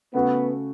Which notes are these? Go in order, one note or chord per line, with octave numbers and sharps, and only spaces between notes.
C#3 A3 B3 F#4